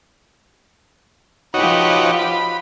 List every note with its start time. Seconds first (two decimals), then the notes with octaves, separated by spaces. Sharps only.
1.54 F3 D#4 F#4 G4 B4 C#5
2.19 B5